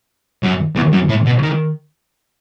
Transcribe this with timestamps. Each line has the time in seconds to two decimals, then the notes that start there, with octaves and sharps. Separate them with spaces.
0.43 F#2
0.76 E2
0.93 F#2
1.09 A2
1.26 B2
1.42 D#3